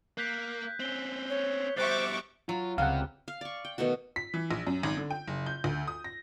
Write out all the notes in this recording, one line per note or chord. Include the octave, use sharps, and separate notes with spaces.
A#3 F#6 G6 B6
C4 C#4 G6 G7
C#5
B2 G3 C5 E5 C#6 D6 F#6 A6
F#3 F4
C#2 C3 G3 F5 F#5
F5
D5 C#6
G5
B2 D#3 A3 F#4
B6
E3
A#1
F#2
G#1
D3
G5
F#1
G6
D2
D#6
A#6